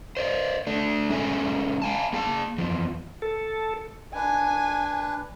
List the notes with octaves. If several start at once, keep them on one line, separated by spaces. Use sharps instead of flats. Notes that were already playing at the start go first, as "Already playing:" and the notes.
C5 D5 D#5
A3 D4
G#3 C#4 G#4 A4 E5 G#5
F5 G#5 A5
A#3 G#4 G5 A5
E2 F3
A4
D4 B4 G#5